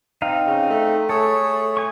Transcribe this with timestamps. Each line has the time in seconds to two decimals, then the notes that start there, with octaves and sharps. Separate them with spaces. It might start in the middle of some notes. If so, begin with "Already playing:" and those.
0.22 C4 D#4 F5
0.46 C#3
0.70 A3
1.09 A3 G#4 A4 C#5
1.77 G#5 C#6